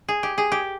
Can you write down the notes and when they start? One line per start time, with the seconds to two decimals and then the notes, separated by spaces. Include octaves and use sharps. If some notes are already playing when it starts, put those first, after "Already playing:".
0.08 G#4
0.23 G4
0.38 G#4
0.52 G4